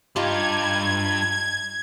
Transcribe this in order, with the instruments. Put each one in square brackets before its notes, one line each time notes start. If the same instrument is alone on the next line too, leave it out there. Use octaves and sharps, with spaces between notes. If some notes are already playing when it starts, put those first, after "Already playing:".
[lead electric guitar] G2 [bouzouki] D#4 F4 G4 [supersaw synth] G#6